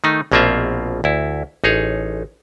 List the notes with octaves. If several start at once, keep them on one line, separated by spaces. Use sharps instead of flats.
D#3 A3 D#4
A#1 B2 A#3 C4 F4 E5
D2 E4
A1 D#4 G#4 C#5